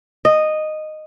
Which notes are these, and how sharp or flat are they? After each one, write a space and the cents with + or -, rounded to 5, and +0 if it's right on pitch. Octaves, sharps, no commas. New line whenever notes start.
D#5 -10